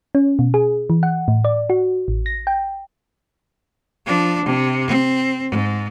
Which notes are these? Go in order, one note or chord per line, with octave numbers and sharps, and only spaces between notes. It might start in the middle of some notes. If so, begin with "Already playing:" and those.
C#4
B2
G#4
E3
F#5
A2
D5
F#4
A1
A#6
G5
F3 D4
C3
C4
G#2